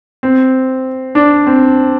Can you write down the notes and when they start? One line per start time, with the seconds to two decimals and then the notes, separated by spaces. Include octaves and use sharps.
0.23 C4
1.15 D4
1.47 C4